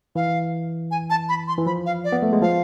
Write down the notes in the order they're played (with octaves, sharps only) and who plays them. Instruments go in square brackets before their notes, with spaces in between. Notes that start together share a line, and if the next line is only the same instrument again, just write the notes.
[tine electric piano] E3 [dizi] F5
[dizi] G#5
A5
B5
C6
[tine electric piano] E3
[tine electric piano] F3 [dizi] B5
[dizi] F5
D5
[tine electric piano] B3
A3
G#3
[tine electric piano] F3 [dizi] F5